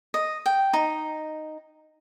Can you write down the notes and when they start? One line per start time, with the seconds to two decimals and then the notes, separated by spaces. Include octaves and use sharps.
0.14 D#5
0.46 G5
0.73 D#4